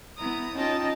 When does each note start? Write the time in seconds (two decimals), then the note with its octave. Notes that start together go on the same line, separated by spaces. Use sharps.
0.16 B3 E4 A#5 D#6
0.56 C#4 D#4 F4 D#5 G5 A5